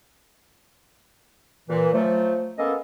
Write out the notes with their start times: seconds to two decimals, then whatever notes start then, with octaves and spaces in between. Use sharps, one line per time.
1.69 A#2 E3
1.94 F3 F#3 A3
2.59 A#3 B3 C#4 A4 D#5